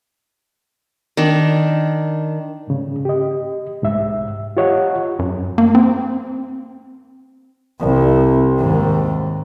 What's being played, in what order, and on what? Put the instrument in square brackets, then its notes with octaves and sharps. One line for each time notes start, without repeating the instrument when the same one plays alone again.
[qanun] D#3 D4
[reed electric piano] G#2 C#3
G4 D#5
C2 G#2 E5
F4 G4 C#5 D#5 F#5
[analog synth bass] F#2
A#3
C4
[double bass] C2
D#2 G#2